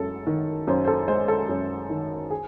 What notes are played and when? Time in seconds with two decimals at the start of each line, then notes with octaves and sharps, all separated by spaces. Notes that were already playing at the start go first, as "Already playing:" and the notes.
Already playing: F#2 G#3 A4
0.27 D#3
0.67 F#2 C5
0.85 C5
0.88 A4
1.08 G#3 C5
1.28 A4
1.49 F#2
1.90 D#3
2.30 G#4